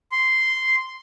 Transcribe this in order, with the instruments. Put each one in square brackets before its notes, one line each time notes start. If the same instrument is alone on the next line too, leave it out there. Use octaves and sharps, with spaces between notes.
[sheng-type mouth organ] C6